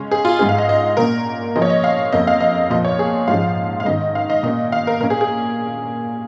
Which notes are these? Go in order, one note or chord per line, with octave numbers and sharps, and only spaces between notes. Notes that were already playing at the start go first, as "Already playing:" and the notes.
Already playing: C#3 G#3 C#4
G#4
F4
G#2 G#3 C#4 G#4
F5
D#5
D#5
A#2 A#3 C#4 A#4
C#3 F3 A#3 C#4 D#5
C#5
D#5
F5
F2 C#3 A#3 D#5
F5
D#5
A#2 F3 A#3 D#5
C#5
G#4
G#2 F3 G#3 C#4 F5
F5
G#2 D#3 C#4 D#5
F5
D#5
A#2 A#3 C#4 D#5
F5
A#4
A#2 A#3 C#4 A#4
G#4
G#4